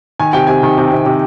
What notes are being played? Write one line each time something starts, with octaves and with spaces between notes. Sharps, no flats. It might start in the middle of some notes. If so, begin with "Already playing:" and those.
D#3 G#5
C3 G5
C3 G#5
D#3
C3
C3
C3